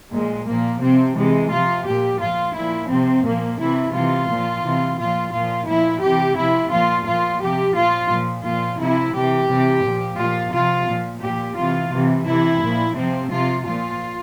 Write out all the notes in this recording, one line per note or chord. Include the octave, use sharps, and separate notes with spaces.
A#2 F3 G#3
A#2 F3 A#3
C3 F3 C4
C3 E3 G#3
C3 F3 F4
A#2 F3 G4
A#2 F3 F4
A#2 F3 E4
C3 F3 C4
A#2 F3 A#3
C3 E3 E4
C3 E3 F4
A#2 F3
C3 E3
A#2 F3 F4
A#2 F3 F4
A#2 F3 E4
C3 E3 G4
C3 F3 E4
A#2 F3 F4
A#2 F3 F4
C3 F3 G4
A#2 F3 F4
A#2 F3
A#2 F3 F4
C3 F3 E4
C3 E3 G4
C3 E3
A#2 F3
A#2 F3 F4
C3 F3 F4
A#2 F3
A#2 F3 G4
C3 E3 F4
C3 E3
C3 E3 E4
A#2 F3
C3 F3 C4
C3 F3 F4
A#2 F3 F4